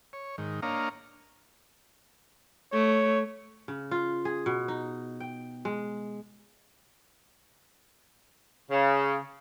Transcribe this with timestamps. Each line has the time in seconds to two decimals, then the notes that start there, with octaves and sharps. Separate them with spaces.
0.13 C#5
0.38 G#2 D#3
0.62 A#3 D4 C#5 D#5 F5 A#5
2.73 A3 C#5
3.68 C#3
3.91 F4
4.25 G#4
4.46 B2
4.68 D#4
5.20 G5
5.65 G#3
8.71 C#3